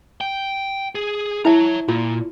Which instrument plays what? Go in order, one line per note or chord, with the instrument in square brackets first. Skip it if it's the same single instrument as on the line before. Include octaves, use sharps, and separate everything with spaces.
[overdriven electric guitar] G5
G#4
[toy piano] E4 E5 A5 [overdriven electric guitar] C#5 A#5
[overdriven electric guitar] A#2 [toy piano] F4